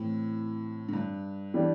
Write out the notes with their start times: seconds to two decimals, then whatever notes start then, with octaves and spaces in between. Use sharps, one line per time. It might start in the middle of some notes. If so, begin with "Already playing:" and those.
Already playing: A2 E3 C4
0.89 A2
0.93 G2
1.54 E3 G3 D4 G4